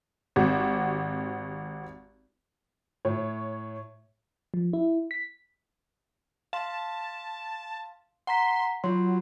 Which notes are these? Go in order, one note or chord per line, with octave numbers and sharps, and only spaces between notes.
G#1 C4 F#4 G4
A2 C#5
F3
E4
B6
F5 A5 C6
F#5 A#5 C6 B6
F#3 F4 C6